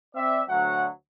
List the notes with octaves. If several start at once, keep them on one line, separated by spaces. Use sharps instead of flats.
C4 D5 E5
D2 F#3 F#5